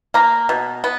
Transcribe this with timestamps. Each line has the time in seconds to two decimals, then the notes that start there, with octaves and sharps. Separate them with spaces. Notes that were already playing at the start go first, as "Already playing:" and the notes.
0.14 A#3 A#5
0.49 B2
0.84 B3